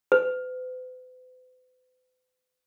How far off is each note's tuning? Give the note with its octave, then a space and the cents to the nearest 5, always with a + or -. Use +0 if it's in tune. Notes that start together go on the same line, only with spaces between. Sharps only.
B4 +45